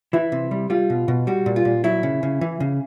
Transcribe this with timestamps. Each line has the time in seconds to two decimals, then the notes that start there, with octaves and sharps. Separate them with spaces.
0.13 E3 E4
0.32 C3
0.51 G3
0.70 G3 F4
0.90 B2
1.08 B2
1.27 G3 F#4
1.46 A#2
1.56 F4
1.65 A#2
1.84 F#3 E4
2.03 C#3
2.23 C#3
2.41 E3
2.60 C#3